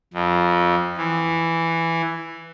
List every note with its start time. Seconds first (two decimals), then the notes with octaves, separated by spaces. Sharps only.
0.13 F2
0.97 E3